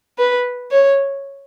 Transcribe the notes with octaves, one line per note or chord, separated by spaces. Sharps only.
B4
C#5